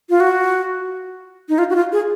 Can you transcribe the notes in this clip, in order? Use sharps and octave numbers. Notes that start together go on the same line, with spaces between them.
F4
F#4
D#4
F4
F#4
F4
G#4